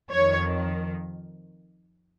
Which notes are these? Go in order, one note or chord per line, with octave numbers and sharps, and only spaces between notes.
F2 C#5
D#3